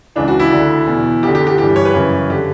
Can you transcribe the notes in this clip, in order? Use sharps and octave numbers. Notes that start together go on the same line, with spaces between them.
C#2 C#3 E3 D4
F#4
E4
D2 D3
E2 B2
D2 G4
D3
G4
G4
G2 E3 G4
C#5
B4
F#2 C#3 E3
D3 G4